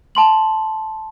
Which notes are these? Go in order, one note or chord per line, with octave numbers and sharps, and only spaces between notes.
A5 C6 F#7